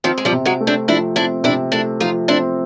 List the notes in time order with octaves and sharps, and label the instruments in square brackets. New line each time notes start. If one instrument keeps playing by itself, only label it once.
[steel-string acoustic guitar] D#3 F3 [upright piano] C4
[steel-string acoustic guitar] G#3
F3 G3
[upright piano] C3
[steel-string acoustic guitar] F#3 G#3
[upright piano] A3
[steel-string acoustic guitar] C4 D4
[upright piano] F3 [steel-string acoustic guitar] D4 E4
[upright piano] C4 [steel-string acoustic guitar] D4 E4
[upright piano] C3 [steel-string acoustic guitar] D4 E4
[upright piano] A3 [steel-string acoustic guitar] D4 E4
[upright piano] F3 [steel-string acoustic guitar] D#4 F4
[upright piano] C4 [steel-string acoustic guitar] D4 E4